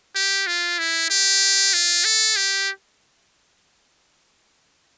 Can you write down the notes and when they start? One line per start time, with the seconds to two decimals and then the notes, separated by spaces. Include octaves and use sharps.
0.15 G4
0.47 F4
0.79 E4
1.10 G4
1.73 F4
2.05 A4
2.37 G4